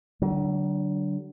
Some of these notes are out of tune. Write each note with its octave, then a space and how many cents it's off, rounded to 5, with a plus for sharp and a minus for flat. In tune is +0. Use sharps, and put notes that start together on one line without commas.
D3 +0 F#3 +40